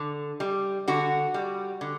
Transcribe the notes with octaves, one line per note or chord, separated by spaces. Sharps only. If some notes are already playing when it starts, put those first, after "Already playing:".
Already playing: D3
G3
D3 F#4
G3
D3